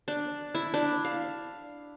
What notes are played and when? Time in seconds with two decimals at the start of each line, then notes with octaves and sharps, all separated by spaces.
0.08 D4
0.55 E4
0.74 D4
1.05 F5